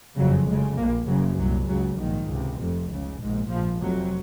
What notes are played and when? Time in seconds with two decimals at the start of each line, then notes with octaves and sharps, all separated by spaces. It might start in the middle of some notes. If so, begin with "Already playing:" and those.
0.17 F#1 F2 C#3 F#3
0.47 F1 F2 C#3 G#3
0.77 A#1 A#2 A#3
1.07 F#1 F#2 C#3 F#3
1.38 C2 F#3
1.43 A#2
1.68 C#2 C#3 F#3
1.99 A#1 G#2 D#3
2.29 C#2 C3
2.59 F1 F2 C3
2.90 C#2 C#3
3.20 A#1 G#2
3.50 A#1 G#2 F3
3.80 F1 F2 C3 F#3